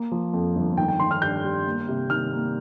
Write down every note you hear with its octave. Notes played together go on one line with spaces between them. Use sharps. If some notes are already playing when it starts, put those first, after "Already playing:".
Already playing: A#3
F3
F2
G1
D#3 G5
G5
D#3 C6
F6
G2 G6
G3
A#3
C3
D#3 F6
A#3